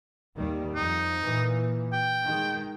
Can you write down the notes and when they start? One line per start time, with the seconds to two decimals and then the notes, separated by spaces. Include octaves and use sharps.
0.37 D#2 D#3 G3
0.75 F2 D#4
1.22 A#2 E3
1.93 G5
2.22 D#3 G#3